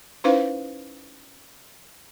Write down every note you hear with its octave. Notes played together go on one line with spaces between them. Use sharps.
C#4 D#4 E4 B4 C5 F5